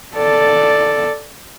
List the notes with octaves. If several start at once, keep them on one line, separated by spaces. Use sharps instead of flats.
A4 D5